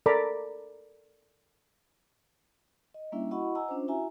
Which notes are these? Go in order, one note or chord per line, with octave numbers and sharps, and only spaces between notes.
A4 A#4 D5 A#5 B5 D6
D#5
G3 A#3 C#4 D4 E4 E5
E4 F#4 D#5 F#5 B5 C#6
D#5 F#5 G#5 A#5 E6
C#4 D4 F4 C5
E4 F#4 E5 G#5 A#5